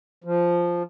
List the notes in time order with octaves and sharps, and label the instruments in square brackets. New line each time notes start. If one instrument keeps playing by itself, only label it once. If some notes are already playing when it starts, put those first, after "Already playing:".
[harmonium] F3